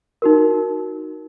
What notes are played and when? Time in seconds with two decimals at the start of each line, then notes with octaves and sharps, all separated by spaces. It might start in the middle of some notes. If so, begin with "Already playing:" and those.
0.22 D#4 F#4 A#4